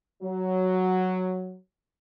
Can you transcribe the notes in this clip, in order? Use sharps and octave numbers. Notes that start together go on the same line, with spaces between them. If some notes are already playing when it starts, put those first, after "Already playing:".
F#3